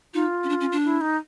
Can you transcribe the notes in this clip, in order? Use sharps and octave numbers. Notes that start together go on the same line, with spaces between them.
D#4 F4
C#4
D4
C#4
D4
E4
D#4